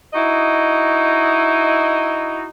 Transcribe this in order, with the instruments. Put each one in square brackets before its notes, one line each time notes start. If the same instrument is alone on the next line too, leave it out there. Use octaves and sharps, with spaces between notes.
[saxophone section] D#4 E4 F#4 D#5